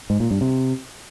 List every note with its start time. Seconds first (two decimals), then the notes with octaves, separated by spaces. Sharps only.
0.10 G#2
0.20 A#2
0.31 G2
0.41 C3